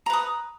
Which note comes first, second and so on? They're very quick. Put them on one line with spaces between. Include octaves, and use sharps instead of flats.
A#5 B4 D#6